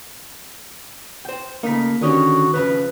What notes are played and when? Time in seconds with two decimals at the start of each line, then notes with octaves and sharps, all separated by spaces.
1.25 C5 G5
1.63 C#3 A3 A#3 D#4 B6
2.01 D3 D#3 C#4 F#4 G4 D#6
2.53 F2 C#3 F3 B4